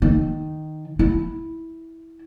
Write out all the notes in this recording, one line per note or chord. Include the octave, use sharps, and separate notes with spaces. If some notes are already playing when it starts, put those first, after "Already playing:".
D#3
E4